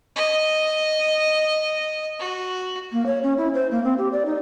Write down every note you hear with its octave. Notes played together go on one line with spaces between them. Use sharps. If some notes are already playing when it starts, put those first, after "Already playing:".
D#5
F#4
A#3
C#5
C#4
E4
C5
A#3
C4
G4
D5
D#4